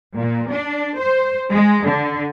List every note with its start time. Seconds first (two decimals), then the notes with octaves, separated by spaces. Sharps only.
0.15 A#2
0.51 D4
0.99 C5
1.52 G#3
1.85 D3